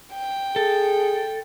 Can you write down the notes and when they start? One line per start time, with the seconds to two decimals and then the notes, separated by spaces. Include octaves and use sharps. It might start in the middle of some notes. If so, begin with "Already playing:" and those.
0.14 G5
0.56 G#4 A4